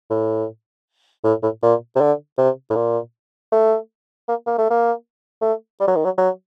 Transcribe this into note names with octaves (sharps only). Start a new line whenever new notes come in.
A2
A2
A2
A#2
C3
D3
C3
A2
A#2
A3
A#3
A#3
A3
A#3
A3
G3
F#3
D#3
F#3
F#3